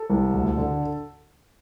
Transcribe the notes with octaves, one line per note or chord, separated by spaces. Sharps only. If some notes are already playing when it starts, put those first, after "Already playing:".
Already playing: A4
C2
D2
D3